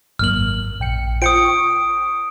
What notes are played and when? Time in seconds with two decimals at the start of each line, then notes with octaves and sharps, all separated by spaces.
0.19 G#1 F#2 A#3 F6 F#7
0.80 A#1 G5 C#7
1.22 F4 C5 G5 D#6 C#7 D7
1.45 C#6